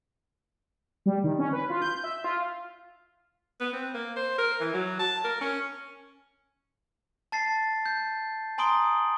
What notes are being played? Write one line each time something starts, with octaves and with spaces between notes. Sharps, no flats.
G3
D#3
C#4
B4
F4
G6
E5
F4
B3
C4
A#3
C5
A#4
E3
F#3
A5
A#4
C#4
A5 A6 C7
G6
G#5 A#5 C6 D#6 D7 G7